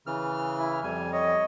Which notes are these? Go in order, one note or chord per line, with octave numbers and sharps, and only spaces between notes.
C#3 E3 F6
E4
F2 G3 G#5
C#5 D#5